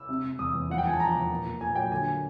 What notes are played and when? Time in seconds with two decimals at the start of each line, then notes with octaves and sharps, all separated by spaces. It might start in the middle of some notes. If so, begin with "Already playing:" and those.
Already playing: E6
0.09 C3
0.24 C3
0.38 E2 D#6
0.54 E2
0.69 F3 F#5
0.78 G5
0.85 F3 G#5
0.93 A5
0.99 F3 A#5
1.15 E2
1.31 A#2
1.46 A#2
1.61 A#2 G#5
1.75 F#3 G5
1.92 D3 G#5
2.07 A#3